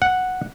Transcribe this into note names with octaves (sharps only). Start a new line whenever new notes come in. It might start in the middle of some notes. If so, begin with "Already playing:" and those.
F#5